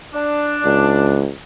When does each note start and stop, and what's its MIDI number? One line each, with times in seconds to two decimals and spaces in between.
0.14 1.19 62
0.65 1.31 37